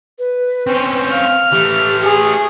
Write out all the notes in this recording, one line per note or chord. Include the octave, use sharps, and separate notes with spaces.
B4
C4 C#4
F5 F6
E3 A3 G4
G#4